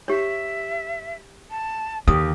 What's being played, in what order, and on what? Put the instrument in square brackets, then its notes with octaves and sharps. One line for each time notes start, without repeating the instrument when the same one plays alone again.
[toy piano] G4 C#5 [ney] E5
[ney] A5
[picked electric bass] D#2 [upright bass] D3 A#3 [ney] G4 [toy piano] D#6